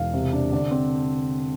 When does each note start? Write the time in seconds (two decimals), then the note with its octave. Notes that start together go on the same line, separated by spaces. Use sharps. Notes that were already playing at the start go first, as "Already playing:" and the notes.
Already playing: E1 F5
0.14 C3
0.32 D4
0.52 D3 D5
0.71 C4